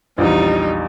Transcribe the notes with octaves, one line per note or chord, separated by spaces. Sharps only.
A#1 E2 G3 D#4